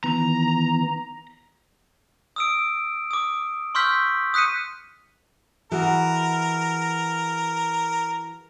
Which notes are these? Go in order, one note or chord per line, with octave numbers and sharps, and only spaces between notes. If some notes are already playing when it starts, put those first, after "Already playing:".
D#3 E3 B3 A#5
D#6 E6 D7
D6 D#6
C6 C#6 E6 F6 G6 B6
D#6 F#6 B6 C#7 D#7
E3 F#4 G#4 A#4